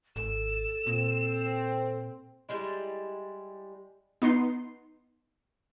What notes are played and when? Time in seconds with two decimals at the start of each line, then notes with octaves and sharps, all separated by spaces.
0.16 G#1 A4 E7
0.87 A#2 C4
2.49 G3 G#3 E4
4.22 B3 D#4 C6 C7